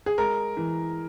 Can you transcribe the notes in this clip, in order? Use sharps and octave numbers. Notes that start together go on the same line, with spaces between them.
G#4
G#3 A#4
E3